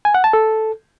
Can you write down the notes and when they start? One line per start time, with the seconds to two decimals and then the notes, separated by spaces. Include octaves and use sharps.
0.05 G#5
0.14 F#5
0.24 A5
0.33 A4